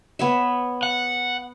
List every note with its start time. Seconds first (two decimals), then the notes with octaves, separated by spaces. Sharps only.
0.19 B3 C#5 E5
0.83 F#5